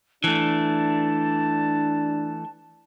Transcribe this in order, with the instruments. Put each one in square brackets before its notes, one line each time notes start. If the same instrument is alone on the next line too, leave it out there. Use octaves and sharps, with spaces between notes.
[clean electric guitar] E3 A3 [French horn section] D4 [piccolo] A5